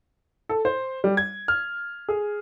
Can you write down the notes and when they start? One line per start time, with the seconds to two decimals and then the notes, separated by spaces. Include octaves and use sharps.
0.49 A4
0.65 C5
1.04 G3
1.17 G#6
1.48 F6
2.09 G#4